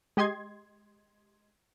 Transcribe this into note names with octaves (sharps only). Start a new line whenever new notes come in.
G#3 G4 D#5 C6 G#6